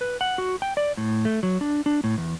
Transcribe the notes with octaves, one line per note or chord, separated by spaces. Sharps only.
B4
F#5
F#4
G5
D5
A2
A3
F#3
D4
D4
A2
E2